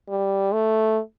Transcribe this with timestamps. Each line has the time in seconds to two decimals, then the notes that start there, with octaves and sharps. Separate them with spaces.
0.09 G3
0.53 A3